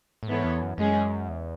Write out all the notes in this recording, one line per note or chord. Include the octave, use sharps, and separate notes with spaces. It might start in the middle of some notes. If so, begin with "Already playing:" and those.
A2
G#2 E3 B3 E4 A4 C#5
E2
F#2
F#2 G#3 C#4 G#4
E2